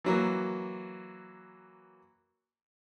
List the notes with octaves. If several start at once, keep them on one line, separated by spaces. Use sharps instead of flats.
E3 F#3 A#3